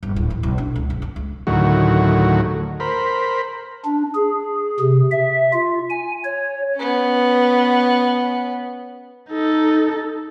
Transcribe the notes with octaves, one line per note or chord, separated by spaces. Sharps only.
G1
D1
A1
B1
D4
C#2
F#1
C4
C#2
D2 A2 D#3 F#3 F#4
A#4 C5 B5
D4
G#4
C3
E5
F4
G#5
C#5
B3 C#4
D#4 A4